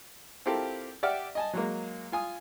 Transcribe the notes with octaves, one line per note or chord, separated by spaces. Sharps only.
C4 E4 F4 G4 A4 A#4
G4 D5 E5 F#5 G5 F6
D#5 G#5 A5
F#3 G#3 A#3
F4 G#5 D#6